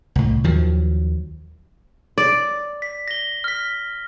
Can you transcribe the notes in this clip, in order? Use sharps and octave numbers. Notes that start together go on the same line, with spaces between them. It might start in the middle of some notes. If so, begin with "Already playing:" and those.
C2 A2
D#2 D#3 F3 F#3
D5
B6
A#6 G7
F6 B6